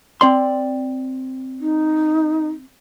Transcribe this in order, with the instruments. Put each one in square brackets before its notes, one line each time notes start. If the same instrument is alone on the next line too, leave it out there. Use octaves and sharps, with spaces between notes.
[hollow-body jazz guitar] C4 D5 C6
[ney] D#4